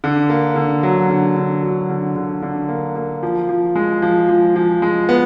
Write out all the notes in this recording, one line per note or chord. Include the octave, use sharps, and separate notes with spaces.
D3
A#3
D3
F#3
D3
D3
F#3
D3
D3
D3
A#3
A#3
F3
F3
G#3
F3
F3
F3
G#3
B3